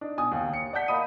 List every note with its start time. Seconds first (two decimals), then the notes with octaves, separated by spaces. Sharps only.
0.01 D4 D#4
0.18 B2 G#5 D#6
0.32 D#2
0.54 C#7
0.73 D5 F#5 A5 G6 B6
0.88 A#3 D#5 B5 D#6 D#7